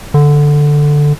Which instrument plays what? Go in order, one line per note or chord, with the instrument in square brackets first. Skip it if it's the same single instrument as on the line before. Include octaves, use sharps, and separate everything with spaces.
[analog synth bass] D3